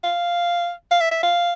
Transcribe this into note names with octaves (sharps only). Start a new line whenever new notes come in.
F5
F5
E5
E5
F5